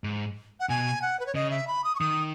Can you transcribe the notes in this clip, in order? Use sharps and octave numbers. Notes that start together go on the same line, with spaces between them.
G#2
F#5
B2 G#5
F#5
B4
C#5
C#3 D#5
E5
B5
D#6
C#6
D#3 D#6